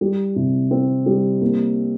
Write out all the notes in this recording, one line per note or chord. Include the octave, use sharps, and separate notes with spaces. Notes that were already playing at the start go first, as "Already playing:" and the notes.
G3
C3
C4
G3
A#3